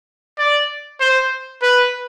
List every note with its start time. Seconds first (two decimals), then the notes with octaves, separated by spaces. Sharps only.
0.38 D5
1.00 C5
1.62 B4